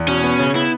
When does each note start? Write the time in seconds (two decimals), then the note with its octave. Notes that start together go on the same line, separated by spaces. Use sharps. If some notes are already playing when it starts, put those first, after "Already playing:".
Already playing: E2
0.08 B2 C#4
0.23 B3
0.40 C#3
0.55 B3 E4